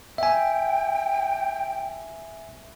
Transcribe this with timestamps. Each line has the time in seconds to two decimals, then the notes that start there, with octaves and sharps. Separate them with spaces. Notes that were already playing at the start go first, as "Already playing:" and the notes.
0.18 E5 G5 G#5